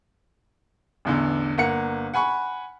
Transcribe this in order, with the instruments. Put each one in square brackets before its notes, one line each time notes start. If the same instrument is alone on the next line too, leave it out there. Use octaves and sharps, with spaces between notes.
[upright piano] A1 E2 D3
G1 A#3 F#5 C#7
F#5 G#5 B5 C#6